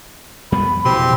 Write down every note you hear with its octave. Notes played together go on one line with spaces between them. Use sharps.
F2 G3 B3 B5
F#1 F2 B2 E3 C4 G4 C6